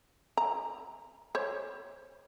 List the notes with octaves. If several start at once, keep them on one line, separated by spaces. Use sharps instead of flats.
A#5
C5 C#5